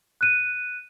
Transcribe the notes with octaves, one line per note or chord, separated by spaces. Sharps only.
F#6 D#7